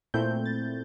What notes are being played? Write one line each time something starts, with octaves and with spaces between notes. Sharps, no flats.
A#2 A3 C4 E4 G6
A6